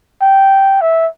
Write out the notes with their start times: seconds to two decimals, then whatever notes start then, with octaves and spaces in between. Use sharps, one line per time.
0.22 G5
0.81 E5